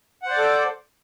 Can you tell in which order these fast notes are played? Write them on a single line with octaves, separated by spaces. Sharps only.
F#5 C5 D5 D6 A4